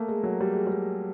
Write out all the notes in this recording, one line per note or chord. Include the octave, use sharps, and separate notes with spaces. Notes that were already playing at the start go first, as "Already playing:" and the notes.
Already playing: A3 A#3
G#3
F#3
G3
G#3
G3